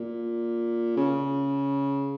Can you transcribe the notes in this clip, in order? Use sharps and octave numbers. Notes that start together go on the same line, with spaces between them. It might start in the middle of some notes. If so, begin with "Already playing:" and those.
Already playing: A#2
C#3